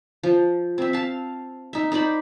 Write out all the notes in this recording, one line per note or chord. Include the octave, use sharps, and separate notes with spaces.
F3
C4 E5
F5 A5
D#4 E5
D#4 C5 D5 B5